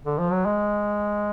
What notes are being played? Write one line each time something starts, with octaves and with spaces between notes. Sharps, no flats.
D3
F3
F#3
G#3